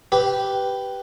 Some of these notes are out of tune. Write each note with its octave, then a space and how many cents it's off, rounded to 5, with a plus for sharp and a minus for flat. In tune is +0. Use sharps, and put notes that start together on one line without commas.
G4 -10 B4 +0